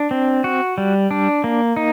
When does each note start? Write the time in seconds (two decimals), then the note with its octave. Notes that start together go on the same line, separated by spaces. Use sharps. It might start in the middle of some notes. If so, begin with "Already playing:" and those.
Already playing: D4
0.11 C4
0.44 F#4
0.78 G3
1.11 D4
1.44 A#3
1.76 D#4